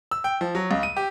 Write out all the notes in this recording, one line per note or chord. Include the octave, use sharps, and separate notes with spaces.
E6
G5
F3
F#3
C#2
D#7
G4